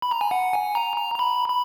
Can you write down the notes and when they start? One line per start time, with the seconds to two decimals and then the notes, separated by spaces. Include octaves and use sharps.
0.02 B5
0.11 A#5
0.21 G#5
0.31 F#5
0.53 G#5
0.75 A#5
0.97 A#5
1.14 A#5
1.19 B5
1.48 B5